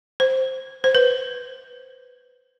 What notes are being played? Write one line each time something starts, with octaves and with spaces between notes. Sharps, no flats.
C5
C5
B4